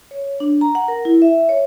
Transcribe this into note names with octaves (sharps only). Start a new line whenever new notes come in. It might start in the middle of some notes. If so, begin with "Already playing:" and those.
C#5
D4
A#5
F#5
A#4
E4
E5
C#5